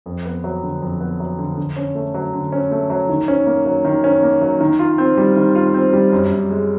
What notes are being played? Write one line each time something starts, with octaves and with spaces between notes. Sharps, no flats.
F2
B3
F#3
D3
F2
B3
F#3
D3
D3
C#4
A3
F#3
D3
C#4
A3
F#3
D#3
C#4
A#3
F#3
D#3
C#4
A#3
F#3
D#3
F4
C4
G3
D#3
F4
C4
G3
F#2
F#2
G#3